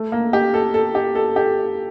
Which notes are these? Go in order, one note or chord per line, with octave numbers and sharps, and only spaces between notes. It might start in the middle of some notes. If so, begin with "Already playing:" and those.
Already playing: A3
A#3
G4
A4
A4
G4
A4
G4